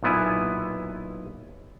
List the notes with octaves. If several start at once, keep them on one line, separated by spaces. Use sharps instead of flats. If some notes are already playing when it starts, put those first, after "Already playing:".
B1 A#2 B3 E4 G#5